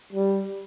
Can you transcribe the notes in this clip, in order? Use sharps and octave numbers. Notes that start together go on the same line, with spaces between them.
G3